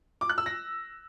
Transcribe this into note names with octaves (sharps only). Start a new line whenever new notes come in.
D6
F#6
E6
A#6